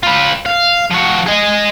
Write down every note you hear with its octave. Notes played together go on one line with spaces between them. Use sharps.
F4 B4
F5
F3 F#4
G#4 D#5